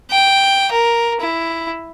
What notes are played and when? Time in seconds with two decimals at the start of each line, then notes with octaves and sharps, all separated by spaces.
0.11 G5
0.71 A#4
1.21 E4